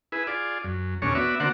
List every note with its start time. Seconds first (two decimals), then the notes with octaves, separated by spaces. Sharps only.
0.12 E4 G#4 B4
0.27 F4 G#4 D5
0.64 F#2
1.02 D#2 A#2 C#4 D4 G#4 C#5
1.15 B3 F#4 D5 E5
1.40 D3 A#3 F#4 C5 D5 F#5